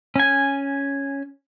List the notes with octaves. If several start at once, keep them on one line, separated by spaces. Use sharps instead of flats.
C#4 G#5